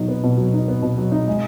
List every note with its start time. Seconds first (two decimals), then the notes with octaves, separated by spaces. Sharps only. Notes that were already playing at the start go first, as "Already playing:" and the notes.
Already playing: B2 F#3 D#4
0.08 B3
0.23 B2
0.38 F#3
0.54 D#4
0.68 B3
0.82 B2
0.98 F#3
1.12 D#4
1.28 G#3